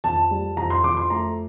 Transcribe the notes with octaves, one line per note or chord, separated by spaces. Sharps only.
F2 A5
G3
F2 A#5
C6
F2 D6
C6
A3 A#5